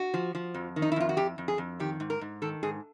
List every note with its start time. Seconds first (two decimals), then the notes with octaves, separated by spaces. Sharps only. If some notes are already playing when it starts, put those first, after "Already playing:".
Already playing: F#4
0.14 F3
0.35 F3
0.54 F2
0.76 D#3
0.82 D#4
0.92 E4
0.96 F2 F4
1.09 F#4
1.17 F2 G4
1.38 F2
1.48 G#4
1.58 F2
1.80 D#3 G4
2.00 G#2
2.10 A#4
2.21 G#2
2.42 D#3 A4
2.63 G#2 G#4